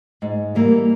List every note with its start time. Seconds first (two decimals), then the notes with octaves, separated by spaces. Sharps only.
0.22 G#2
0.55 E3 G3 A#3